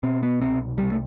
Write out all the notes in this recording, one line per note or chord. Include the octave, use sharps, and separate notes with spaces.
B2 C4
B3
C2 C4
C2 G3
A3